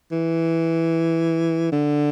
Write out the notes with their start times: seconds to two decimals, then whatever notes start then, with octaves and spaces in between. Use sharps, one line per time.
0.11 E3
1.72 D3